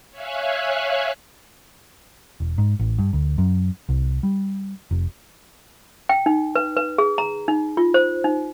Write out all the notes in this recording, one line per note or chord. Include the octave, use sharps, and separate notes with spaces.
C#5 E5 F5 G#5 F#6
E1
G#2
A1
G2
D2
F#2
C2
G3
F1
G5
D#4
B4
B4
G#4
A#5
D#4
F4
C5
D#4